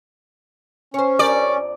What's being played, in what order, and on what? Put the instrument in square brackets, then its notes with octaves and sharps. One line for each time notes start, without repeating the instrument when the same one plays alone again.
[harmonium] C#4 [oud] C5 C#5
[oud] F2 G4 A#4 [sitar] D5